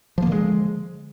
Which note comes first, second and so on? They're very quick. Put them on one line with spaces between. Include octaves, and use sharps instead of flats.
F3 A#3 D3 G#3